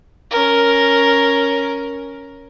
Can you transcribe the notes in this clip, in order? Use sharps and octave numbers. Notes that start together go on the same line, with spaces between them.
C#4 A#4